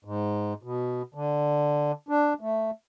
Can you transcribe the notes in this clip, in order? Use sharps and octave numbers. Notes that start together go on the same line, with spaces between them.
G#2
B2
D3
D4
A3